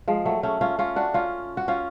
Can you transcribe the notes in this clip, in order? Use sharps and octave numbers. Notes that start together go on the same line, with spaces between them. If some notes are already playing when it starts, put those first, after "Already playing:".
F3 G#3
F#3 A3
A3 C#4
C#4 F4
C#4 F4
D4 F#4
C#4 F4
F#4
C#4 F4